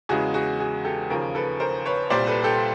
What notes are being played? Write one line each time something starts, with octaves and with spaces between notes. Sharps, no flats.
E2 C#3 E3 G#3 F#4 G#4
F#4 G#4
F#4 G#4
G4 A4
D#2 C#3 F3 G#4 A#4
A4 B4
A#4 C5
B4 C#5
C2 A#2 G3 C5 D5
A4 B4
G4 A4